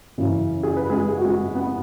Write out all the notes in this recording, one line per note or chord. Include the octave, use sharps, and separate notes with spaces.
F#2 C#3 E3
G#4
B4
G#3 G#4
G#4
F#4
G#3 G#4
B3